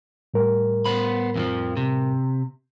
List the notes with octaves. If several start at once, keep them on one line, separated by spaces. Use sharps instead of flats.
A2 G3 A#4
B3 C5 B5
F2 E3 F3
C3